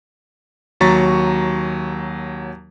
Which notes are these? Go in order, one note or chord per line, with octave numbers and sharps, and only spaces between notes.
D#2 F#3 A#5 C#6 A6 B6